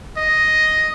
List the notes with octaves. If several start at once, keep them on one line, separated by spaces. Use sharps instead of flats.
D#5